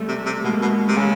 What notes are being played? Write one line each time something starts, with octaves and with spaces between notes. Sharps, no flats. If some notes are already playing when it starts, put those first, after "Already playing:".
Already playing: G3 A3
C3
C3
B2 G#3 A#3
B2
C3 A3
C#3 G#3 A#3